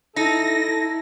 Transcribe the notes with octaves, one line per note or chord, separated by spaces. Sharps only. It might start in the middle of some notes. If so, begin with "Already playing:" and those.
D#4 E4 A4 A#6